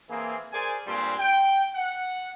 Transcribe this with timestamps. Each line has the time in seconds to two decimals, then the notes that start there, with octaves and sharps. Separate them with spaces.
0.10 E3 A#3 C4 G#4
0.52 G#4 A#4 C5 D5 G#5
0.87 G2 A#2 G3 G#3 C4 C6
1.19 G5
1.74 F#5